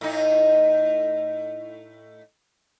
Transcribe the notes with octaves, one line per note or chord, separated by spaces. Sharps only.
A2 D#4